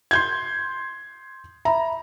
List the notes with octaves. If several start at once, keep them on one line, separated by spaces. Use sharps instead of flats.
C6 G6 G#6
E5 A#5 B5